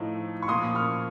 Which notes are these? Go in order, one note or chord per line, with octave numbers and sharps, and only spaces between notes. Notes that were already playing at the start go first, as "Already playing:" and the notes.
Already playing: A2 F3 A3 D#4
C#6
A#2 F3 A#3 C6 D#6
C#6 F6